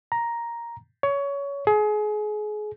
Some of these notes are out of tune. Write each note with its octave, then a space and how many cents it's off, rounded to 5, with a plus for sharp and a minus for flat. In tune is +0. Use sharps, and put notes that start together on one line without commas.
A#5 +5
C#5 +20
G#4 +30